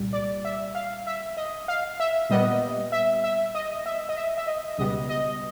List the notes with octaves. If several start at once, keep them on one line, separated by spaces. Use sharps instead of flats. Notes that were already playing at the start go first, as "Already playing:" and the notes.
Already playing: C2 A#2 G3
D5
E5
F5
E5
D#5
F5
E5
A#2 G3 B3 D#5
E5
E5
D#5
E5
D#5
E5
E5
D#5
C#2 B2 G3 B3 D#5
D#5